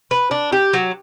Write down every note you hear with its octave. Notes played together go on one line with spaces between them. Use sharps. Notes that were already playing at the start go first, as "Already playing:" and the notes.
B4
D4
G4
F#3